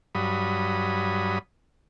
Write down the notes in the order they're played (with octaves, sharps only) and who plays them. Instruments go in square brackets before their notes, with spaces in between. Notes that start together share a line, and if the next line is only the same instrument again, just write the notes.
[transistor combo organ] G2 F#3 B5 D#6